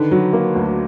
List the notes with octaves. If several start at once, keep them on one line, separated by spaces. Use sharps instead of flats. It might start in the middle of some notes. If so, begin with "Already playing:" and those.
Already playing: D3 D#3 B4
F#3
A#3
D2